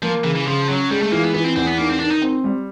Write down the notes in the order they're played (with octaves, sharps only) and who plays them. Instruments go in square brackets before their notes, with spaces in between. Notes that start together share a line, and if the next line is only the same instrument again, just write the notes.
[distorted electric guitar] F3 [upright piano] A#3
[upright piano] C#3 [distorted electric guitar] E3
[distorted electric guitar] E3
[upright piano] C#3 [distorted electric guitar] F3
[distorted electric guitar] F#3 [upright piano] C#4
[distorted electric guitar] G3 [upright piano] G#3
[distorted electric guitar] A3
[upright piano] E3 [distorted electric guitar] A#3
[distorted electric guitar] B3
[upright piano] E3 [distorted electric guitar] B3
[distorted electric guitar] C4
[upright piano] E2 [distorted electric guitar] C4
[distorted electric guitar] B3
[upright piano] D#3 [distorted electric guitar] A#3
[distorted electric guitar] C4
[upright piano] D#3 [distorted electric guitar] D4
[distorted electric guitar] D#4
[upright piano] C4
G3